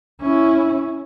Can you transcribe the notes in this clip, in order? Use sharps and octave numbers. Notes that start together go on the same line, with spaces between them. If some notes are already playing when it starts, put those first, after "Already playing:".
C#4 E4